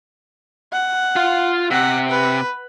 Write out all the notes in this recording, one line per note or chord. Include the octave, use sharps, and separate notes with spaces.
F#5
F4 F5
C3 F#5
B4